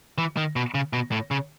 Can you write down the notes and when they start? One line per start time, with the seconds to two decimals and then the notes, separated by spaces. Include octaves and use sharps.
0.18 E3
0.37 D#3
0.56 B2
0.75 C#3
0.93 B2
1.12 A2
1.31 C#3